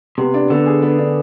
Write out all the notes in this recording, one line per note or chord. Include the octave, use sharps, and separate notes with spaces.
C3 B3
D4
D3 B3
G#4
B3
D4